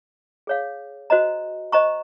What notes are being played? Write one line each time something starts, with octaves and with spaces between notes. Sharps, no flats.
G#4 C#5 F5
F#4 C5 D#5 A#5
C5 D#5 A#5 C#6